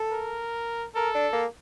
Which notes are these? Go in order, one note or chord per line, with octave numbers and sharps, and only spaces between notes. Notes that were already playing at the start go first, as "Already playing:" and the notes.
Already playing: A4
A#4
A4 A#4
D4
A#3